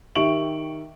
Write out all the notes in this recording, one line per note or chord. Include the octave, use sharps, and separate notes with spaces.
D#3 G4 E5 C#6 D7 F#7